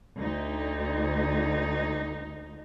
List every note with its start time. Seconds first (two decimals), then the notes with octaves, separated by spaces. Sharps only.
0.17 D2 D#4